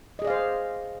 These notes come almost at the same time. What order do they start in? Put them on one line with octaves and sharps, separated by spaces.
D#5 G#4 D5 F5 C5